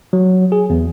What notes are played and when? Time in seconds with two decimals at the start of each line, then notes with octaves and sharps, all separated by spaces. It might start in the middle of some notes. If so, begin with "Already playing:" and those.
0.13 F#3
0.52 G#4
0.70 E2